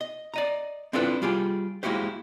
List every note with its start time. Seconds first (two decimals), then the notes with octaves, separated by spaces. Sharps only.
0.01 D#5
0.34 D5 D#5 A#5
0.93 C4 D4 E4 F4 A4 B4
1.22 G3 F4 G4 G#4
1.83 G#3 A#3 E4 F#4 G4 C5